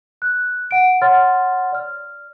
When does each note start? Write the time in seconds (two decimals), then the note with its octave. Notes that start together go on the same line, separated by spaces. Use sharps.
0.22 F#6
0.71 F#5 D7
1.02 C#5 F#5 C6 F6 A6
1.72 D5 F6